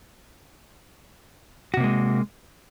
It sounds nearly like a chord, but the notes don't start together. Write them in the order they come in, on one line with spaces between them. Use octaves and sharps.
F#4 C3 A#3 G#3